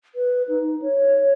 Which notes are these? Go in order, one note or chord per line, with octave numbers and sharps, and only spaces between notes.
B4
D#4
C#5